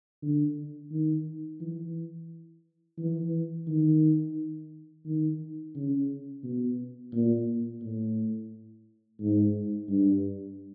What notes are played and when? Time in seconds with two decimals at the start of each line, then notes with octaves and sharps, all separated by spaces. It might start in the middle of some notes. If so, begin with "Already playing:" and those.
0.22 D3
0.91 D#3
1.60 E3
2.98 E3
3.67 D#3
5.05 D#3
5.75 C#3
6.43 B2
7.13 A#2
7.82 A2
9.20 G#2
9.89 G2